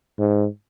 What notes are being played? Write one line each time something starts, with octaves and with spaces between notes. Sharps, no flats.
G#2